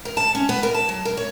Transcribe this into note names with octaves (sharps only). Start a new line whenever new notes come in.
A#4
A5
C#4
B3
A#4
A5
F#3
A#4
C#5